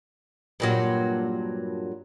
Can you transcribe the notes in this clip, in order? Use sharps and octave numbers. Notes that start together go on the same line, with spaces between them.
G2 A#2 F#3